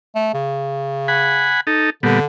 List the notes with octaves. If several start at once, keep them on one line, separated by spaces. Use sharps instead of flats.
A3
C#3
F#5 G#5 B5
D#4 A4
A#2 D3 G3 B3